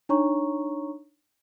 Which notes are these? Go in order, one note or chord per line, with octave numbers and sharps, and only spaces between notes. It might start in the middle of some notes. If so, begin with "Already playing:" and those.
D4 D#4 C#5 A#5 C#6